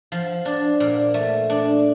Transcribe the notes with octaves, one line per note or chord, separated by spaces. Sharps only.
F3
D4
A#2
A3
D4